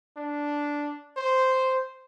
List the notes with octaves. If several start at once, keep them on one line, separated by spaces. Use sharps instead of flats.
D4
C5